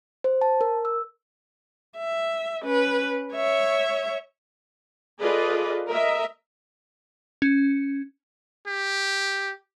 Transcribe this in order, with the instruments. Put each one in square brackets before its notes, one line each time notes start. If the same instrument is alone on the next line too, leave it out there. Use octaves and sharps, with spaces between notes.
[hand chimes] C5
A5
A#4
E6
[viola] E5
C#4 B4
C#5 E5
[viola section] F4 G#4 A4 B4 D5 D#5
A#4 D#5 E5
[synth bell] C#4
[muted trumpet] G4